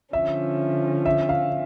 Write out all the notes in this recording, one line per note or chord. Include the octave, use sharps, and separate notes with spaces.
D3 F3 C#4 E5
E5
F5